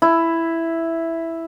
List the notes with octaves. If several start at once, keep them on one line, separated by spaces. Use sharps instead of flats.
E4